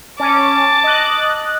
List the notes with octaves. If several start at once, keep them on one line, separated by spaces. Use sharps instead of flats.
C#4 A5 D6
D#5 F#6